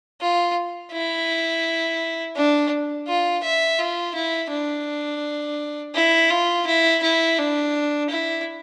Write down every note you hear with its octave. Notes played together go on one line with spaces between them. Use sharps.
F4
E4
D4
F4
E5
F4
E4
D4
E4
F4
E4
E4
D4
E4